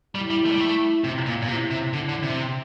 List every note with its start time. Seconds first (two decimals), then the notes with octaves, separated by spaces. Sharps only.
0.15 G3 E4
0.30 G3
0.46 A3
0.52 G3
0.60 A3
1.04 C3 F4
1.26 A#2
1.42 A#2
1.48 C3 E4
1.71 C3
1.93 D3 E4
2.09 D3
2.23 C3